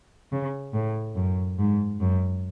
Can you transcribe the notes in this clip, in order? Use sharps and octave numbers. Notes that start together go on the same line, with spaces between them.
C#3
A2
F#2
G#2
F#2